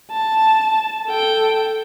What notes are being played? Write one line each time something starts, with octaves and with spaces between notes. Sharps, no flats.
A5
A4 G5